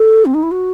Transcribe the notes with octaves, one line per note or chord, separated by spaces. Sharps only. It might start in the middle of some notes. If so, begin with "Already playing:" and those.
Already playing: A4
C4
D#4
E4
F#4